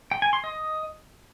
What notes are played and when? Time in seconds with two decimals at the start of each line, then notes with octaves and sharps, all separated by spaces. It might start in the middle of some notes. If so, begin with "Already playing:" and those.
0.11 G5
0.22 G#5
0.33 C6
0.44 D#5